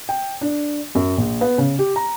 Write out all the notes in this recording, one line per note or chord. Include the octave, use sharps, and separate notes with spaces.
G5
D4
F#2
A#1
B3
C#3
G4
A#5